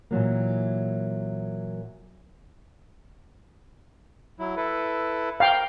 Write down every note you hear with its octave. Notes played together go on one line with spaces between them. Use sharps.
A#2 E3 F#3 A#3
F#3 E4
E4 A4 B4
A#4 F5 G5